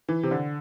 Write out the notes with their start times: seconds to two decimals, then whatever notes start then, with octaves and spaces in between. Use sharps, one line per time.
0.09 E3
0.23 C3
0.31 D3